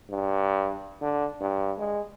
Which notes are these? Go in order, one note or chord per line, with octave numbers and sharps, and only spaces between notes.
G2
D3
G2
G#3